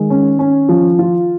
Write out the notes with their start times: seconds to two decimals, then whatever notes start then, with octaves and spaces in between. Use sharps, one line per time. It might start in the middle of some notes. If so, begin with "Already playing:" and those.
Already playing: D#3 G#3
0.10 C#4
0.39 C#4
0.69 F3
0.99 F4